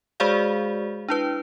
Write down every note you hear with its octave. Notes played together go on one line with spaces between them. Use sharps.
G#3 F#4 G#4 C5 D5 F5
D4 E4 B4